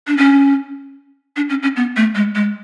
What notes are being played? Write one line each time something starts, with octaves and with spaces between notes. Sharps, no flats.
D4
C#4
D4
C#4
C#4
B3
A3
G#3
G#3